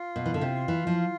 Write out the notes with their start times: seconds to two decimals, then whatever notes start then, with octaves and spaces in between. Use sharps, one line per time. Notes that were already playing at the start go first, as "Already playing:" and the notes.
Already playing: F4
0.16 B2
0.26 E3
0.34 D3
0.41 C3
0.68 E3
0.87 F3